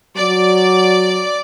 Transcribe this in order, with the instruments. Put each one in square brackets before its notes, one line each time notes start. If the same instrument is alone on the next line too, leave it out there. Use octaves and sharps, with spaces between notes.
[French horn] F#3 [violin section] D5